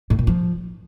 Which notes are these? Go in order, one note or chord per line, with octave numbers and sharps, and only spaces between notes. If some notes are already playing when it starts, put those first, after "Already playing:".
A2
A#2
F3